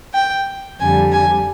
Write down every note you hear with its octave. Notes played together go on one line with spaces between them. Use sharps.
G5
F2 D3 G3 G#5
G#5